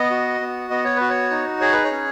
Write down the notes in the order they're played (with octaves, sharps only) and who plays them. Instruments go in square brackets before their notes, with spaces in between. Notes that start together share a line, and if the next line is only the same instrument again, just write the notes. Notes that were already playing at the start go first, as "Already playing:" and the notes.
Already playing: [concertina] B3 D#5
F#4
B3
B3 D#5
C#5
F#4 B4
C#5
D#4
G#4 C#5
B4
C#5
C#4